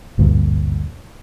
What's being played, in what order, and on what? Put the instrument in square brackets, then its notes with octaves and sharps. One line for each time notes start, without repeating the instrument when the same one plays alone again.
[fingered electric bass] G#1 D2 G2 A#2